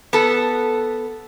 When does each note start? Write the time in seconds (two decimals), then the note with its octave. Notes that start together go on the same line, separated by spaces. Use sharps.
0.13 B3 A4